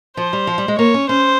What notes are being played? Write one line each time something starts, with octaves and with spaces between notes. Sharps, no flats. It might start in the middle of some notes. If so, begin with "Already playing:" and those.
F3 C5
G3
F3
G3
G#3
A#3 C#5
C#4
C#4 C5